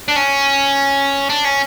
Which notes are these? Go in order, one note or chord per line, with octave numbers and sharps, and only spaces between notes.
D4
C#4
D4
C#4